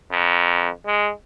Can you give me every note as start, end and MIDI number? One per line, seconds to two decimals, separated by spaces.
0.11 0.70 41
0.86 1.11 56